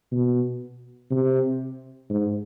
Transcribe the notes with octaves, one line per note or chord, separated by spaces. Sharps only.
B2
C3
G#2